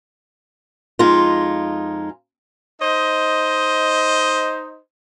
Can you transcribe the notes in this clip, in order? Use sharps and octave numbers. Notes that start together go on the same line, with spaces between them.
F2 G#3 D#4 F4
D#4 C5 D#5